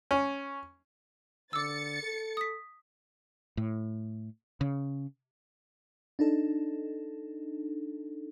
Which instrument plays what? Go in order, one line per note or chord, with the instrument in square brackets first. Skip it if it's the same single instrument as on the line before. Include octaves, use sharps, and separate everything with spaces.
[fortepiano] C#4
[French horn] D3 [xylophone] D6 E6 [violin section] A6 C#7
[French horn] A4
[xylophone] D#6 B6
[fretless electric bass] A2
C#3
[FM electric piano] D4 D#4 A4